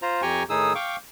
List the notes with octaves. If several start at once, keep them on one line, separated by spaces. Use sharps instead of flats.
F4 C5 A#5
F2 G4 G5 G#5 A#5 C#6
A2 D#3 D#4 G#4 D#6 E6
F5 G5 C#6 D6